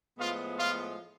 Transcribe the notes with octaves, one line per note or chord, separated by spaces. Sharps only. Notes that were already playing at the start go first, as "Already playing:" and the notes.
A2 F3 G#3 B3 F4 F5
F4 F5